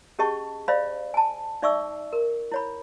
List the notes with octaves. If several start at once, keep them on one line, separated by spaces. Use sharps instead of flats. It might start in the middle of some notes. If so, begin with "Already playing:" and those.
C#4 G4 G#4 D#5 A5 C#6
C5 D5 D#5 F5 B5
G#5 A5
D#4 D5 E5 C#6 D6 E6
A#4
E4 C#5 B5